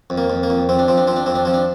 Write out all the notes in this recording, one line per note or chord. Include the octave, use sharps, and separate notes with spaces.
F2
A#3
F2
A#3
F2
F2 C4
D4
F3 C4
D4
F3 C4
D4
F2 C4
D4
F3 C4
D4